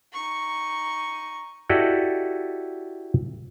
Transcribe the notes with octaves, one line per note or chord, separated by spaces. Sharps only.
D#4 C#6
E4 F#4 G4 A4 D5 D#5